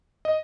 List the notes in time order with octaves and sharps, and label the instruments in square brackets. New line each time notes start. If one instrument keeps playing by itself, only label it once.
[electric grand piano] D#5